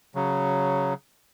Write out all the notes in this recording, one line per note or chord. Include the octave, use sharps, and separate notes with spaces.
C#3 F#3